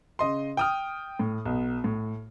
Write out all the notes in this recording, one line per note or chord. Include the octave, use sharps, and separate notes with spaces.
C#3 D#5 C6
G5 D#6 F6
A2
B1
A2